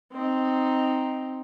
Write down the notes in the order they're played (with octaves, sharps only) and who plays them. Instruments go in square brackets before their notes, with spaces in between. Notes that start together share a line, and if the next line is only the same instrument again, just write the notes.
[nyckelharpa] C4 D#4